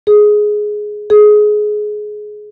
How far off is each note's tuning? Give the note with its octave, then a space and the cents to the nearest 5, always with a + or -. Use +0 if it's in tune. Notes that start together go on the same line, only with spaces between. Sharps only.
G#4 +10
G#4 +20